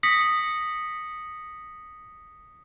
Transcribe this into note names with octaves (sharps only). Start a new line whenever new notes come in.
D#6 A#6 B6 C#7 F#7